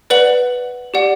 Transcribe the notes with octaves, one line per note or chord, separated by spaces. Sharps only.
B4 D5 F#5 F#7
G4 D5 F#5